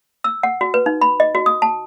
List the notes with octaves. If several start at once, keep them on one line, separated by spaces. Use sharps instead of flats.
E6
F#5
F#4
B4
D#4
B5
D#5
F#4
D#6
A5